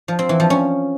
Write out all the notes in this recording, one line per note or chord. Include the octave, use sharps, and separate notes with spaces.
F3
C4
E3
F3
C#4